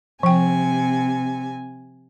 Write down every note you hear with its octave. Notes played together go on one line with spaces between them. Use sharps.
C3 F3 G5 G#5